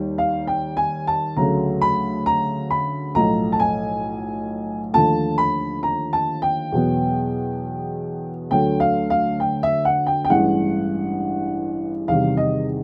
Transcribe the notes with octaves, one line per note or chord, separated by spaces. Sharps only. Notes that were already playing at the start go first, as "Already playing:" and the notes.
Already playing: D#2 D#3 G3
F5
G5
G#5
A5
D2 C#3 F#3 A3 A#5
B5
A#5
B5
B1 A2 F3 A3 A#5
A5
G#5
D#2 D3 F3 A3 A5
B5
A#5
A5
G5
E2 B2 F#3 B3
D2 D3 F#3 A3 G5
F5
F5
G5
E5
F#5
G5
G5
A1 G2 E3 G#3 F#5
E2 C3 D#3 G3 F5
D#5